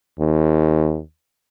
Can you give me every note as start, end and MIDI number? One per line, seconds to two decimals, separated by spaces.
0.20 1.00 39